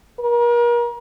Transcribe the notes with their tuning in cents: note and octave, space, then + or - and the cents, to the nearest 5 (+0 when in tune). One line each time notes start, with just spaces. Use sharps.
A#4 +40